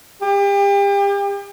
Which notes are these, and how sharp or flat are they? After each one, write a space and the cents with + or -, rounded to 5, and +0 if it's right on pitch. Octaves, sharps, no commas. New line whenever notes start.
G4 +35